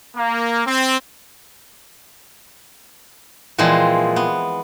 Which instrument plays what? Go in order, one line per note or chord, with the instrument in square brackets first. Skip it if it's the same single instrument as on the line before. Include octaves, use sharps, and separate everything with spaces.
[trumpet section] A#3
C4
[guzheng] A#2 E3 F3 G#3 C4
B3